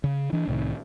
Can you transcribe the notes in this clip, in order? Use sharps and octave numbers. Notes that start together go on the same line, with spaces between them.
C#3
E3 D4
C2 A2 C3 D#3